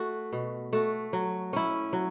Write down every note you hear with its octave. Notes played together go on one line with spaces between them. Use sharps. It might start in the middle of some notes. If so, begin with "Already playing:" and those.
Already playing: A3 F#4
B2
A3 F#4
F#3
C#4 E4
F#3